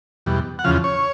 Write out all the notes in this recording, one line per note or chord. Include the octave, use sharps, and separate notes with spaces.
E2 B2 G3
F#5
E2 C#3 F3 F5
C#5